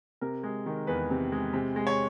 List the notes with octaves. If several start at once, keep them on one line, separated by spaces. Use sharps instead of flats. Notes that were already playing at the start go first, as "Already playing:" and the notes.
C3 A#4
G#3
D#3
E2 B4
C3
G#3
C3
G#3
C#5